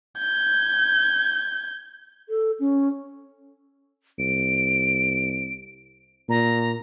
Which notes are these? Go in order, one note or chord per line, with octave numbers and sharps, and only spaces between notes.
G6 G#6
A4
C#4
C2 D7
A#2 A#5